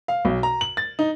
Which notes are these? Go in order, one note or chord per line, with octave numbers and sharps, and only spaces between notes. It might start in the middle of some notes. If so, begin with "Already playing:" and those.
F5
B1
A#5
F#7
A6
D#4